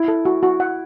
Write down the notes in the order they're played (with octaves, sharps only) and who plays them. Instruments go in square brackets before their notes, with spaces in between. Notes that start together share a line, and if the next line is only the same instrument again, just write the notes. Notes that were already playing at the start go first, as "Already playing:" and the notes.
Already playing: [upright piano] E4
[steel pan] A4
F#4
F#4
F#5